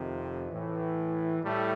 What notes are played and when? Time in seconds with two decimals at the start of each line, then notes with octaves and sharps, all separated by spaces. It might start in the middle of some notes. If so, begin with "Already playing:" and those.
Already playing: F2 C3 D#3
0.48 A2 E3
1.42 A2 G3 A3